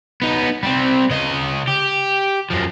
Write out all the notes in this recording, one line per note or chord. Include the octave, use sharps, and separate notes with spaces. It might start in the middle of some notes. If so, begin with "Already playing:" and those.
B3 D#4
G3 C4
C#3 D#5
G4
F#2 F3